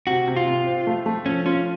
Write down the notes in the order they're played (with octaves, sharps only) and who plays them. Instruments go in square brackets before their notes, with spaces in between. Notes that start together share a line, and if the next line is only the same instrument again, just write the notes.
[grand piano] C3 [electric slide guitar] F#4
[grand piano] C3
[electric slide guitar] F4
[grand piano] C3
C4
A3
A3
[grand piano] F3 [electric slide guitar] C#4
[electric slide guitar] C#4 [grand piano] F4